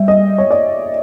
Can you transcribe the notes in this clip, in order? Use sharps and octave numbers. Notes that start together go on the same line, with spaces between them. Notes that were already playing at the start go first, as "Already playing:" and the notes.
Already playing: G3 E5
D#5
C#5
D5